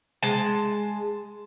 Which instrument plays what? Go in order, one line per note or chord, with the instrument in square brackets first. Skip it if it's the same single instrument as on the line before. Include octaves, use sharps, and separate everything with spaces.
[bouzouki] G#3 A5